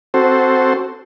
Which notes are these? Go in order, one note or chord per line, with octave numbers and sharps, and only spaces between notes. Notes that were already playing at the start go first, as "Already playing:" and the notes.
C4 F#4 A4 C5